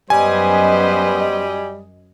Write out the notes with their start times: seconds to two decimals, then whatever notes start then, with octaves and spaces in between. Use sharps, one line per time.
0.10 F#2 G3 B3 B4 C5 D#5 G#5